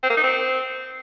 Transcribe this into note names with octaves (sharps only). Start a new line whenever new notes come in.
C4
A#3
D#4
C4